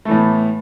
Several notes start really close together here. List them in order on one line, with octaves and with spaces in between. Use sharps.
A3 E3 A2 B3